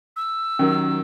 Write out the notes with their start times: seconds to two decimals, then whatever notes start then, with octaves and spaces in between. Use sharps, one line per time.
0.16 E6
0.59 D#3 F#3 C#4 G4 A#4